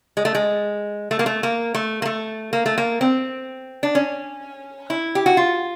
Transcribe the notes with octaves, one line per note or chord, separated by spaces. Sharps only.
G#3
A3
G#3
A3
A#3
A3
A#3
A3
A#3
A3
A#3
A3
A#3
C4
D4
C#4
E4
G4
F#4
F4